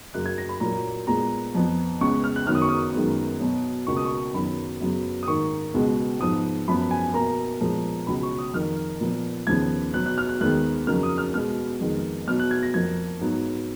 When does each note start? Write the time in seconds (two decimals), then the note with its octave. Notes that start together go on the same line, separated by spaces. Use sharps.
0.14 F#2 C#3 F#3 A#3 F#6
0.26 G#6
0.38 A#6
0.49 B5
0.60 A#2 F#3 A#3 A#5
1.07 A#2 G#3 B3 A#5
1.54 F2 F3 B3
2.01 C#2 C#3 G#3 B3 C#6
2.24 F6
2.36 F#6
2.47 F#2 D#3 F#3 B3 F6
2.55 D#6
2.62 C#6
2.69 D#6
2.94 F#2 D#3 G#3 B3
3.40 B2 F#3 B3
3.87 C#2 B2 A#3 C#6
3.97 D#6
4.05 C#6
4.34 F#2 D#3 F#3 B3 B5
4.81 F#2 C#3 F#3 B3
5.23 D#6
5.27 G#2 D#3 A#3 C#6
5.74 C#2 B2 G#3 B3
6.20 G#2 F3 B3 D#6
6.68 F#2 F3 B3 B5
6.91 G#5
7.14 B2 A#3 A#5
7.61 A#2 F3 G#3 B3
8.07 C#2 B2 F#3 B5
8.23 C#6
8.39 D#6
8.54 F2 D#3 A#3 F6
9.01 A#2 F3 B3
9.47 D#2 C#3 F3 B3 G#6
9.94 B2 F#3 B3 F#6
10.06 F#6
10.18 F6
10.29 F#6
10.41 D#2 D#3 G#3 B3 F#6
10.87 F2 C#3 F#3 A#3 F6
11.03 D#6
11.18 F6
11.33 B2 G#3 B3 F6
11.80 F2 D#3 G#3 B3
12.27 B2 F#3 B3 F6
12.39 F#6
12.51 G#6
12.63 A#6
12.74 F2 F3 A#3 G#6
13.20 G#2 F#3 B3